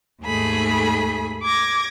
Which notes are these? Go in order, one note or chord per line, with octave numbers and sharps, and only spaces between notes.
D#2 G#2 A3 G#4 B5
D6 G#6 A#6